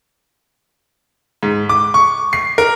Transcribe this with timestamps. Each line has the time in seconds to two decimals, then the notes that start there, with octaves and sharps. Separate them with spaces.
1.43 G#2
1.69 D6
1.94 C#6
2.33 C7
2.58 A#4